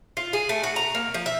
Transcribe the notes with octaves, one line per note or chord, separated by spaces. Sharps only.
F4
G#4
A3
F#4
A#5
A#3
F3
E5